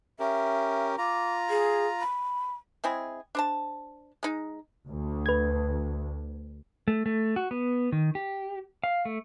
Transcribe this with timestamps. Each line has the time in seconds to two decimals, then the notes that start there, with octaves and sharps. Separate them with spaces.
0.20 C#4 G4 A#4 E5
0.98 F4 A#5 D6
1.50 G#4
2.00 B5
2.84 G#3 C4 E4 G#4
3.35 D4 C5 A5
4.23 G#3 D#4
4.87 D2
5.26 B4 G#6
6.88 A3
7.06 A3
7.36 F#4
7.51 B3
7.92 D#3
8.15 G4
8.84 F5
9.05 A3